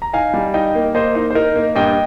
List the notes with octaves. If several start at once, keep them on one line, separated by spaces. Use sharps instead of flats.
A#5
D#4 F5 G#5
G3
D#4 D#5 G5
A#3
A#3 C5 D#5
D#4
C5
D#4 A#4
A#3
G2 D#5 G5